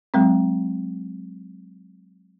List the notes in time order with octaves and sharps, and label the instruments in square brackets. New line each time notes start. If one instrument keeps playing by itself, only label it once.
[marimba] F#3 G#3 C4